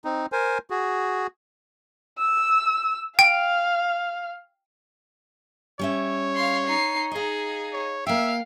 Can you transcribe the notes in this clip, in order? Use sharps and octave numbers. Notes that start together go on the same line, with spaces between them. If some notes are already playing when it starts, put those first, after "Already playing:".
C4 D#4
A#4 C5 G#5
F#4 G#4
E6
F5 G5
G3 C#4 C#5 E5
F5 C6
D#4 C7
D#4 G#4 D#5 F5
C#5
A#3 E5 F5 G5